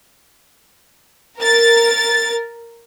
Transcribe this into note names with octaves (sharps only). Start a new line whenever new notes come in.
A#4 A6